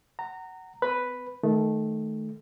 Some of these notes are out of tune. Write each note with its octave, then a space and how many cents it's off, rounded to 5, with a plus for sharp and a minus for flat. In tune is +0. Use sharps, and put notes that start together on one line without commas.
F#5 +20 A#5 -20
B3 +40 B4 +0
D#3 +10 A3 -15